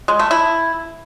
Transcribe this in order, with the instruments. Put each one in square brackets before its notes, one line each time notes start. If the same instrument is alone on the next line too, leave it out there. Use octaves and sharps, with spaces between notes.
[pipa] G#3
A3
E4